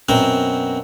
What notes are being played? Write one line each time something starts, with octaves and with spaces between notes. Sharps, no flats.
F#2 B2 C4 A#4